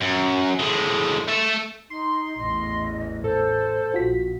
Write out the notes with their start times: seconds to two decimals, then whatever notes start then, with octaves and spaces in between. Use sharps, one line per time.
0.01 F#2
0.59 A2 G#3
1.28 A3 A4
1.90 D#4 C6
2.39 A1 E2 E3 D#5
3.24 A2 A4 C5
3.94 A#1 F4 F#4 B6